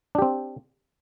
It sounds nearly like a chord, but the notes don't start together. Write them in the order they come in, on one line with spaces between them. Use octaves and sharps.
D4 G4 C4